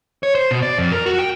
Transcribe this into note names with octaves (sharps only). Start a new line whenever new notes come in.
C#5
C5
B2
D5
F2
A#4
F#4
G5